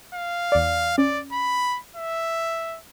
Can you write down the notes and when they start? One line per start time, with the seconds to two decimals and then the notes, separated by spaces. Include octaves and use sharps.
0.14 F5
0.52 E2 D5
0.98 C#4 D5
1.32 B5
1.96 E5